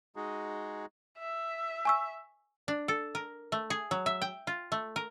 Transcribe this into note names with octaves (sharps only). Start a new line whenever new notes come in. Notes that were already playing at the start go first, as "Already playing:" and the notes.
G#3 D#4 F#4 G#4
E5
G#5 C#6 E6
D4
A4
A#4
A3
G#4
F#3
E5
G5
F4
A3
A#4